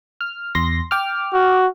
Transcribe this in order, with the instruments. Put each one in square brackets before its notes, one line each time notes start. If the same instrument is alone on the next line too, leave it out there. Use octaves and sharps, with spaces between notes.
[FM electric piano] F6
E2 C6 A#6
G5 D6 F6
[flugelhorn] F#4